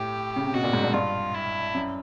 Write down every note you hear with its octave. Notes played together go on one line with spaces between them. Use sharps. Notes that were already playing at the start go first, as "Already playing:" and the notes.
Already playing: A2 G4
C#3
C3
B2 F#4
A#2
G#2
G2
G2 F4
E4
F#2